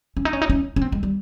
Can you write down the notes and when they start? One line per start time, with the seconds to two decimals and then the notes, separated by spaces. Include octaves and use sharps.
0.17 C#4
0.25 D#4
0.33 C#4
0.42 D#4
0.50 C#4
0.76 C#4
0.82 C4
0.92 G#3
1.03 G3